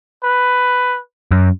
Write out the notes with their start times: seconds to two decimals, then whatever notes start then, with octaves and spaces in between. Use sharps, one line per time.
0.24 B4
1.31 F#2